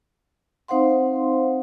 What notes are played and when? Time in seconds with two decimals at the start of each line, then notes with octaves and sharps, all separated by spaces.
0.68 C4 D#4 C5 F5 F#5 C6